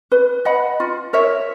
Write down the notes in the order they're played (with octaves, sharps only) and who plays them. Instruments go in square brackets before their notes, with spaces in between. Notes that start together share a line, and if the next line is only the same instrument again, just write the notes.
[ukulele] B4
D#5 F#5 B5
F4
A#4 C#5 E5